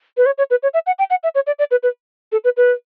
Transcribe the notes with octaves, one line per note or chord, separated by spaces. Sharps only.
B4
C#5
C#5
B4
C#5
E5
F#5
G5
F#5
E5
C#5
D5
D5
B4
B4
A4
B4
B4